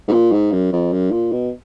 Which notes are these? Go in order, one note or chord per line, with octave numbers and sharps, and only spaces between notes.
G#2
A#2
G#2
F#2
F2
F#2
A#2
B2